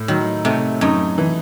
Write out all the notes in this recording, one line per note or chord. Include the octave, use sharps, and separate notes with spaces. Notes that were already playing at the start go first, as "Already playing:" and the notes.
Already playing: A2
D#3 F#3
C3 A3
F#2 D#4
E3